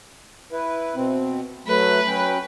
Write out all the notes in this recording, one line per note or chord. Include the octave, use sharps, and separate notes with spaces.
E4 B4
B2 C4
F#3 A3 B4
F#3 C#4 G5